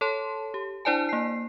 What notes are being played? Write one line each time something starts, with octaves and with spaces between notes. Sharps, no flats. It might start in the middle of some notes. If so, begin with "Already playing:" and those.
A4 C#5 A5 C6
G4
D4 E4 C5 D5 G#5 A5
A#3 C7